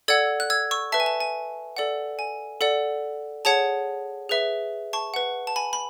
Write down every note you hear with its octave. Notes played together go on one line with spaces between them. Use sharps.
A4 D5 F#5 E6 G#6
F#6
E6 G#6
C#6 E6
B4 E5 A5
G#5
A5
G#5
A4 D5 F#5
G#5
A4 D5 F#5
G#4 C#5 F#5 A5
G#4 B4 E5
A5 C#6
B4 F#5
A5
G#5 B5
B5